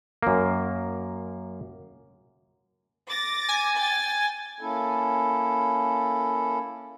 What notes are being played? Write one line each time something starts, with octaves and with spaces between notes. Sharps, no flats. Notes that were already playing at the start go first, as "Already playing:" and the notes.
F#2 A#3
D6 A6 A#6
G#5
G5 A6
A#3 C#4 E4 A4